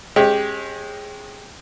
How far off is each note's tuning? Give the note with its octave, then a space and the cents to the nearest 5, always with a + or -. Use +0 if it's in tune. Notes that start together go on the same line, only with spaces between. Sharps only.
G#3 +0 C#4 -40 G4 +0